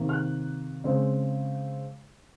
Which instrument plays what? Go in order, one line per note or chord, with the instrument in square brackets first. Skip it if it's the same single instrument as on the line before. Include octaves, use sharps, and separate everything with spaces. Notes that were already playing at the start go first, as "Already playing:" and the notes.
Already playing: [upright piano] C3 D#3 A#3
F6
F#6
C#3 G#3 C4